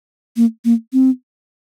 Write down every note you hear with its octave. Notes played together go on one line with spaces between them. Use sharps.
A#3
A#3
C4